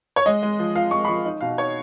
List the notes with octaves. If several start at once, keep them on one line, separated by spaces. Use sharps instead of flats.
C#5
G#3 D#5
G#3
F3
F3 F5
G#3 C#6
B5
F3 C#6
D#4
B2 F5
D#4 C#5